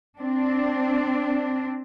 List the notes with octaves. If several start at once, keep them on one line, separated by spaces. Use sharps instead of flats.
C4 D4